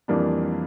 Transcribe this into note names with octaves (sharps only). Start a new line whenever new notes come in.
F2 E3 G3 A#3 D4